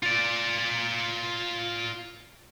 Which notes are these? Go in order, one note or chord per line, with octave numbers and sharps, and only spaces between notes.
F4 D5